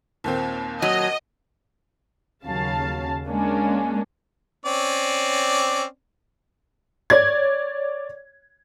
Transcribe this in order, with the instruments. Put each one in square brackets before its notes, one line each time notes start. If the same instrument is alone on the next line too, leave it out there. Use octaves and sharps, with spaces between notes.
[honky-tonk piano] D#2 A#2 C4
[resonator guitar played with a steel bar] F#3 [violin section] D#5
[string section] D#2 C#3 F#3 F5 A5
G#3 A#3 C#4 D4
[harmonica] C4 C#4 D5
[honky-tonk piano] C#5 D5 G#6